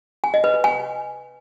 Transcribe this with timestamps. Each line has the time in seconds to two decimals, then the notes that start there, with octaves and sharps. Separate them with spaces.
0.24 G#5
0.34 D#5
0.44 B4
0.54 B4
0.64 G#5